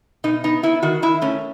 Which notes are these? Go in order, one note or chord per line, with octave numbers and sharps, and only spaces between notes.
B2 D#4
B3 D#4
B3 E4
D#3 F#4
D#3 E4
A3 C#4